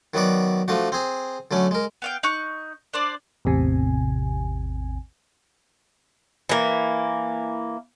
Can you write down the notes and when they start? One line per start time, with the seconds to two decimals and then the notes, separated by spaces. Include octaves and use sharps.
0.14 D#3 F#3 B3 F#4 D5
0.68 F3 A3 D4 F#4
0.92 C4 G#4
1.51 D3 F#3 A3 C#4
1.71 G#3 A#4
2.02 B3 F5 G5
2.23 D#4 C#6 F#6
2.93 D4 C5 D5
3.45 A1 E2 C3 G#5
6.49 E3 A#3